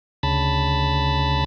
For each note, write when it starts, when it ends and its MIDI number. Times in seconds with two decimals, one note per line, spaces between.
0.23 1.44 38
0.23 1.44 49
0.23 1.44 81
0.23 1.44 83